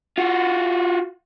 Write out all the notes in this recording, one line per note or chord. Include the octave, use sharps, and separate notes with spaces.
F4 F#4